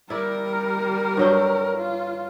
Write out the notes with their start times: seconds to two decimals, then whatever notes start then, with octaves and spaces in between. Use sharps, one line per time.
0.10 G3 E4 A#4 D5
1.17 G2 F#3 G5
1.78 F4